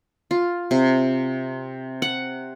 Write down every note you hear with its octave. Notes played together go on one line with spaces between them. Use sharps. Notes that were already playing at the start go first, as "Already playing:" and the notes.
F4
C3
F#5